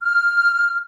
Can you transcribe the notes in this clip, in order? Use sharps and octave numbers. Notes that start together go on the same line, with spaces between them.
F6